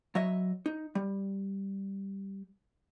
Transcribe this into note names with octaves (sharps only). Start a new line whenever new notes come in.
F#3 C#5 D#5 E5
D#4
G3